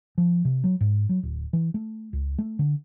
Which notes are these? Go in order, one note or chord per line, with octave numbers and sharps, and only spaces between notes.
F3
C3
F#3
G#2
F#3
D1
E3
A3
C#2
A3
D3